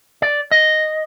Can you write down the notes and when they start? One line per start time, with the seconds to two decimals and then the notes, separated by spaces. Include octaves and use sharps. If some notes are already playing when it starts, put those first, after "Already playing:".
0.22 D5
0.51 D#5